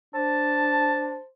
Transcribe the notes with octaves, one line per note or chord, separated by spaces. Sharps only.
D4 C5 A5